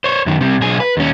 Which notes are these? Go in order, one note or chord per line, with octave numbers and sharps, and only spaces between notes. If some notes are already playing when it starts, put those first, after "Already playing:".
C5 C#5
F#2 D#3
C2 C3
B1 G#4
B4
D#2 C#4